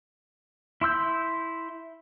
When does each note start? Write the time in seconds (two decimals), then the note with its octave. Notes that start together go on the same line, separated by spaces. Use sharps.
0.81 E4 C6 E6 G6